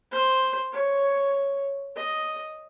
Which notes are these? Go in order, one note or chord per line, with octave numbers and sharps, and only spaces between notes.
C5
C#5
D#5